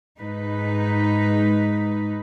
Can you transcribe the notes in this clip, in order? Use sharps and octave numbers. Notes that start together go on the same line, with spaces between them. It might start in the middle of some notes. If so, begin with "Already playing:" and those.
G#2 D#4 B4